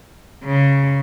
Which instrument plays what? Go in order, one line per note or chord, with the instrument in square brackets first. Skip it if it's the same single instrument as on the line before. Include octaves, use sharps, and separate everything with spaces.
[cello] C#3